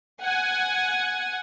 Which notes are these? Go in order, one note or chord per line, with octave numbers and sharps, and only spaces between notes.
F#5 G#5